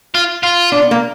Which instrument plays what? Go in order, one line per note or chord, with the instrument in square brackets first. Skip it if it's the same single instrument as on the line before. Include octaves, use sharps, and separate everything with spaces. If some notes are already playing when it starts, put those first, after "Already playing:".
[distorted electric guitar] F4
F4
[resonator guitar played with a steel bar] D4
B3
A#3